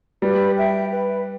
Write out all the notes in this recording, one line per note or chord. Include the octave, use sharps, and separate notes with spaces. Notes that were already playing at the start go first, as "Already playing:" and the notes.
G3 B4
E5 G5
B4